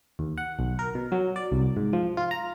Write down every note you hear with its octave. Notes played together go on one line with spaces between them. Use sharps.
D#2
F#5
B1
A#4
B2
F#3
D5
C2
G#2
F3
F4
A#5